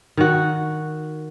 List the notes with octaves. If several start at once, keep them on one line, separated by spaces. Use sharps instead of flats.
D#3 F#4